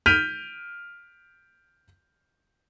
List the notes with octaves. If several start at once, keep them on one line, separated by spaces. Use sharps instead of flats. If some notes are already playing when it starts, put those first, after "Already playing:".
F6 G6 B6 D7 D#7 F7